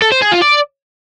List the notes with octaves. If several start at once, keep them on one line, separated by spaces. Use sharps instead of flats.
A4
C5
G#4
F4
D5